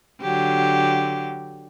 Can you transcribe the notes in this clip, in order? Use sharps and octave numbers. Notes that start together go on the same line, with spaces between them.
D3 F#3 G4